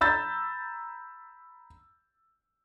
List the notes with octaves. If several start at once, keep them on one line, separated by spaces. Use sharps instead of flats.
A#5 B5 E6 G6 A6